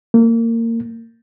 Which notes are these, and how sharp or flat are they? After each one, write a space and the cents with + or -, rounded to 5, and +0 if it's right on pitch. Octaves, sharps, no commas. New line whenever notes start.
A#3 -25